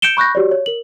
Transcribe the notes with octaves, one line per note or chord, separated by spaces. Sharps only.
G6 C#7 D7 E7 G7
B5 C#6 F#6 G6 A#6
F#4 G4 C#5 D5
C#5
A#4 F#7